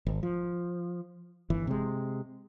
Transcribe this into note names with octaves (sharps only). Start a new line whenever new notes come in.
G#1
F3
G1 E3
C3 G#3